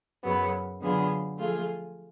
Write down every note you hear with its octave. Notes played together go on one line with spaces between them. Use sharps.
F#2 C#3 F#3 B3
D3 F#3 B3 F4 G#4
F3 A3 F4 G#4